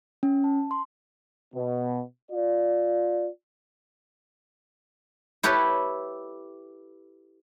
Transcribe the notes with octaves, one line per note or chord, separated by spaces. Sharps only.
C#4
A5
C6
B2
F4 D5
E4 G4 A4 B4 C#5